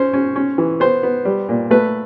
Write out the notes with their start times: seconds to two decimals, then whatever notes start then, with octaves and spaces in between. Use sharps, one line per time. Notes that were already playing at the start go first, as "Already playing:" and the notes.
Already playing: C#4 C5
0.13 C#4
0.36 C#4
0.58 E3
0.80 B3 C5
1.03 B3
1.25 G3
1.49 A#2
1.71 A3 B4